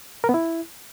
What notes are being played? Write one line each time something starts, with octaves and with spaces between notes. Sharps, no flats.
A#4
B3
E4